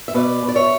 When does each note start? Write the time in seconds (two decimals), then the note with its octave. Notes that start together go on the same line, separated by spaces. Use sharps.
0.08 E5
0.14 B2 B4 D5
0.42 B2
0.48 D5
0.56 C#5 E5